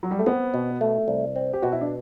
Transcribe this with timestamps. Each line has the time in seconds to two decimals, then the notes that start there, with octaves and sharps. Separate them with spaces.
0.03 F#3
0.11 G3
0.19 A3
0.26 B3 C4
0.54 B2
0.81 A3
1.08 C2
1.36 C4
1.53 G4
1.62 B2 F#4
1.72 E4
1.81 D4